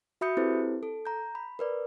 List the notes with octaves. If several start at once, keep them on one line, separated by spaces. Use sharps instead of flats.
F#4 E5 B5 D#6 G6 C#7
C4 E4 G4 A4 B4 C5
A4
A#5 G6
B5
A#4 B4 D5